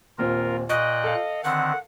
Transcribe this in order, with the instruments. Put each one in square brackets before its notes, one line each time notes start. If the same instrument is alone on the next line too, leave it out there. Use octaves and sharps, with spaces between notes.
[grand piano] D#1 A#2 C4 [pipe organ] F4 A#4
[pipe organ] A#2 G5 F#6 [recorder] D#5 [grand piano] C#6
[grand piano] A4 F5
[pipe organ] D3 D#3 C4 [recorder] F#5